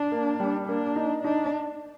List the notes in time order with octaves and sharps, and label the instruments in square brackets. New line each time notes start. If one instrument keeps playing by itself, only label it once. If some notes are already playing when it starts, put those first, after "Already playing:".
Already playing: [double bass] D4
[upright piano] A#3
G3
[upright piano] A#3 [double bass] D4
[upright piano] D#4
[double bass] D4 [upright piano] D#4